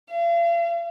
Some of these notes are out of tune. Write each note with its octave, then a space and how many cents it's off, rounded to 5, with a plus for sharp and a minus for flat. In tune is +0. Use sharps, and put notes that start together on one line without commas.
F5 -40